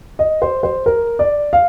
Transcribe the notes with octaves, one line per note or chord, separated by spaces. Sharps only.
D#5
C5
C5
A#4
D5
F5